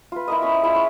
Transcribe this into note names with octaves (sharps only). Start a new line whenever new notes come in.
F4 B4
E4 A#4 D#5
C#4 B5 C#6
G#3 E4 F4
C#5